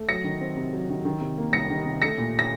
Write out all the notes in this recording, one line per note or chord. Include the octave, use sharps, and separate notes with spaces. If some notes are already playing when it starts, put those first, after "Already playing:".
Already playing: A3
F#3 A#6 C#7
D#3
C4
C3
F#3
D#3
D#3
C3
A#3
C2 A#6 C#7
D#3
C3
A3 A#6 C#7
A#2
A#6